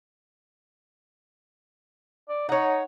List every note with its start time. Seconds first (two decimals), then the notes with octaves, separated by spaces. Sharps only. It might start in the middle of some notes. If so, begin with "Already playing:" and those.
2.29 D5
2.49 D#4 C#5 F#5